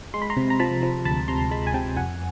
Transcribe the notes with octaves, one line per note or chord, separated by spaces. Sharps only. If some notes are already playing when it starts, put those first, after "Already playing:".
G#3 C6
B5
A#5 C6
C3
A#5
F3 A5 B5
F3
D2 A5 B5
C3 A#5 C6
G#3 A5 B5
G#5
C3 G5 A5
F2 F#5 G#5